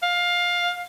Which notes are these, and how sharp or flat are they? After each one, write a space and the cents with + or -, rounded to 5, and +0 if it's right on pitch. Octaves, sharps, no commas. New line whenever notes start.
F5 +15